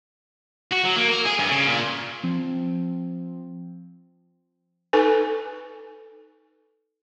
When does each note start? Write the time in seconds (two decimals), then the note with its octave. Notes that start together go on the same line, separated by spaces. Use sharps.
0.72 F#4
0.85 F#3
0.98 A#3
1.10 A#4
1.26 G#4
1.39 G2
1.51 C#3
1.67 A#2
2.23 F3 C4
4.93 D#4 A4 B4 G#5